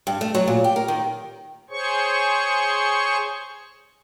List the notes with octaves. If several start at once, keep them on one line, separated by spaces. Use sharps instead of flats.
G2
A3
F#3
A#2
G4
A#4
D#3
G#4 C5 C#5 C#6